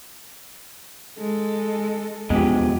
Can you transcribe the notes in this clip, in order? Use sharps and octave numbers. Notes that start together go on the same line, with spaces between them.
G#3 A4
E2 B2 F3 G#3 B3 C#4 G4